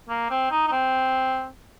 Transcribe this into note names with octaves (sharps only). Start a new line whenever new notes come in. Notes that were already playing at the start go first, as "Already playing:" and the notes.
A#3
C4
D#4
D#4
C4